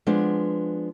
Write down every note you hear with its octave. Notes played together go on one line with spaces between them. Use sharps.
F3 G#3 B3 D4